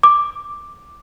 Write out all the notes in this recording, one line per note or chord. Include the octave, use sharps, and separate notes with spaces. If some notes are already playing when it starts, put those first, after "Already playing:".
D6